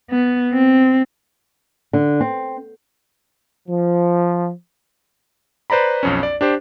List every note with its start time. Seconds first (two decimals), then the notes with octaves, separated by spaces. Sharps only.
0.10 B3
0.53 C4
1.93 D3
2.20 C4
3.68 F3
5.70 B4 C5 D5 A#5 B5
6.03 B1 F2 C#4
6.23 D5
6.41 D4 G4 C5